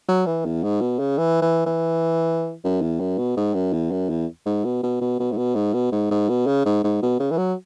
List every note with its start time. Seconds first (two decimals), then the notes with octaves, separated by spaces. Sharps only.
0.08 F#3
0.26 E3
0.45 E2
0.63 G#2
0.81 B2
0.99 C#3
1.18 E3
1.41 E3
1.66 E3
2.64 F#2
2.81 E2
3.00 F#2
3.18 B2
3.36 G#2
3.54 F#2
3.73 E2
3.91 F#2
4.09 E2
4.46 G#2
4.64 B2
4.83 B2
5.01 B2
5.19 B2
5.32 G#2
5.37 B2
5.55 G#2
5.73 B2
5.91 G#2
6.11 G#2
6.29 B2
6.46 C#3
6.65 G#2
6.84 G#2
7.02 B2
7.20 C#3
7.31 E3
7.37 F#3